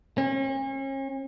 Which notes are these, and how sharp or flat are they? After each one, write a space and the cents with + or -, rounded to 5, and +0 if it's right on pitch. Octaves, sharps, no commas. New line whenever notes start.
C#4 -40